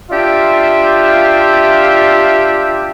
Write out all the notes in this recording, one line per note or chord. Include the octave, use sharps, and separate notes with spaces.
D4 F4 G4 D5 E5